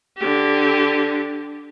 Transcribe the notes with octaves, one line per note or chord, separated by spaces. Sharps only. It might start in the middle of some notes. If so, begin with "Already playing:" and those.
D3 G4